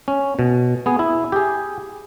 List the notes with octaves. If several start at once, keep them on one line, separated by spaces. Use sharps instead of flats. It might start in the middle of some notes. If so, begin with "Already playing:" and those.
C#4
B2
B3 G#4
E4
G4 G#4